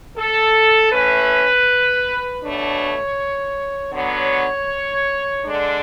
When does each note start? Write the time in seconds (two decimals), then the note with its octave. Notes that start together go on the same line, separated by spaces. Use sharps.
0.18 A4
0.93 E3 A3 C#4 B4
2.43 B2 A3 D4 C#5
3.93 D3 F#3 B3 C#5
5.44 D3 G#3 D4 D5